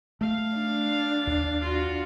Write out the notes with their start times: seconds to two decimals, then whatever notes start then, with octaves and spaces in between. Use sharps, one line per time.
0.21 A3 F5
0.56 D4
1.27 D#2
1.62 F4 F#4